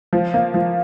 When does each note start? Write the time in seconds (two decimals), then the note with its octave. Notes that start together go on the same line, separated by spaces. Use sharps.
0.13 F3
0.34 A#3
0.54 F3